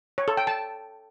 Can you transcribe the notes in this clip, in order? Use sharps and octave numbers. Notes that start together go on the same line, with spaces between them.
C#5
A4
G5
A5